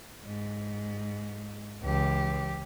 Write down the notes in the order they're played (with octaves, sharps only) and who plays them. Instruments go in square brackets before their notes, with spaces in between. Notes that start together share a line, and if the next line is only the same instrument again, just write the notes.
[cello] G#2
[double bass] C#2 [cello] E3 G4